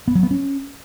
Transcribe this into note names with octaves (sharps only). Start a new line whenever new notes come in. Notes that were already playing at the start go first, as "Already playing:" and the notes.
B3
F#3
B3
C#4